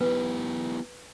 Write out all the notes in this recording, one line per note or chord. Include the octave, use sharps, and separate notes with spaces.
B3 E4 G4 B4